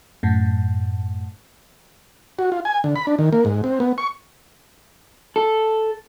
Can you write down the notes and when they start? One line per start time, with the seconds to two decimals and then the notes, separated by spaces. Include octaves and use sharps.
0.23 F#2 A2
2.39 F#4
2.52 F4
2.65 G#5
2.84 D3
2.96 B5
3.07 D4
3.19 D#3
3.33 A#3
3.45 G#2
3.64 C4
3.80 B3
3.98 C#6
5.36 A4